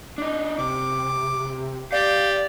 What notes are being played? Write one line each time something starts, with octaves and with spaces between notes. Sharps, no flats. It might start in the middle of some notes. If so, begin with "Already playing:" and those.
D4 D#4
C3 D6
G4 D5 F5